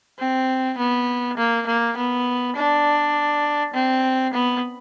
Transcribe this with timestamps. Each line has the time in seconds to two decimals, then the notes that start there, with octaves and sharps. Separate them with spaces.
0.19 C4
0.78 B3
1.38 A#3
1.67 A#3
1.97 B3
2.56 D4
3.74 C4
4.33 B3